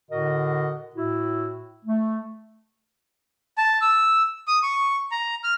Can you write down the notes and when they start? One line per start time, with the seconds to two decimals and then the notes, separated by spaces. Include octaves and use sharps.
0.10 A2 D3 F#4 A#4 D#5
0.96 A2 E4 F#4
1.86 A3
3.58 A5
3.81 E6
4.48 D#6
4.63 C#6
5.12 A#5
5.44 F6